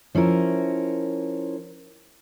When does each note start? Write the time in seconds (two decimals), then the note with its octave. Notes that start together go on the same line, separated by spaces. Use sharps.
0.15 F3 C#4 E4 A#4